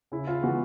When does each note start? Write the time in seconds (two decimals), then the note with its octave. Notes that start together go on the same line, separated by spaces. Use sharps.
0.12 C#3 E4
0.27 F4
0.42 E3 G#3 B3 F#4